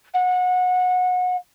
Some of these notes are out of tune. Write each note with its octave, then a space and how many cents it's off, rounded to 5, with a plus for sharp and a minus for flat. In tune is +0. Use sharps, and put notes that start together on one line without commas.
F#5 -25